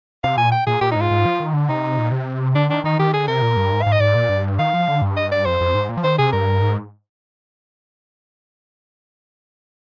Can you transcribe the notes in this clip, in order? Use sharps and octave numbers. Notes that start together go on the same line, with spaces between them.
C3 F5
A#2 G#5
G5
A#2 G#4
A#2 G4
D#4
G#2 F4
G#2
F3
D#3
D3
C3 D#4
A#2
C3
D3 D4
D#3 D4
D#3 D#4
D#3 G4
D3 G#4
C3 A#4
A#2
G2
G#2
F5
G#2
D#5
G#2 D5
A#2
G2
D#3 F5
F3
D3
G2
D#5
D5
F2 C5
F2
G#2
A#2
F3
D#3 C5
C3 G#4
G2 A#4
G#2